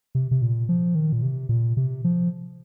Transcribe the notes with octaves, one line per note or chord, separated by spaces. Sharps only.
C3
C3
A#2
F3
D#3
A#2
C3
A#2
C3
F3